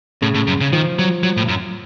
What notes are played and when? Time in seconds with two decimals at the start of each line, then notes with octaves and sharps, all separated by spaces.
0.22 A2 C#3
0.35 A2
0.47 F#2
0.61 C#3
0.73 D#3 F3
0.99 F#3
1.24 F#3
1.37 A2
1.49 F#2